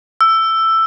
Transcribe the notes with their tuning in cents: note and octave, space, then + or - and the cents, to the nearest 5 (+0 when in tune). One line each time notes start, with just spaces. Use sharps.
E6 +10